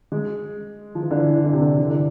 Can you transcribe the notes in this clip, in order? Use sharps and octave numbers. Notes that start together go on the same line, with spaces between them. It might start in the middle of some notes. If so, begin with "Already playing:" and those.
G#3
F3
E3
D3
E3
E3
D3
C3
D3
E3
D3